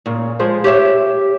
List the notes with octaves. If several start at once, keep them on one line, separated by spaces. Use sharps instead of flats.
A#2 C#3
F3 G#3 C5
G4 C#5 E5